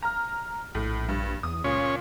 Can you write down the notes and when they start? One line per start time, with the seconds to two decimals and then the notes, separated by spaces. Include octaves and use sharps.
0.03 A#5 F6
0.75 A#1 A2
1.09 G2
1.43 E2 D#6
1.64 C#2 A#2 C#4